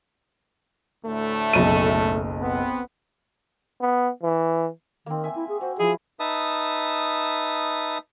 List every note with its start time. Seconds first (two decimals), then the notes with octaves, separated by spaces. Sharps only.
1.05 D2 A2 A3
1.53 F#1 B1 D#7
2.41 B3 C4
3.81 B3
4.23 E3
5.06 D#3 A#3 C4
5.23 E5 G#5
5.35 E4
5.49 G#4
5.61 F#4 C5
5.79 F3 E4 G#4 E6
6.20 D#4 B4 E5 A5 D#6